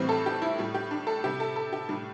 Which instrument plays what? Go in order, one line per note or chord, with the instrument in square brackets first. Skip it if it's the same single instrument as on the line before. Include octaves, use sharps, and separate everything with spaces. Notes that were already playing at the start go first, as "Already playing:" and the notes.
Already playing: [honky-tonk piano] A2 E3 G3 C4
A4
G4
E4
A2 G3
G4
D4
A4
C3 G3 G4
A4
A4
G4
A2 G3 D4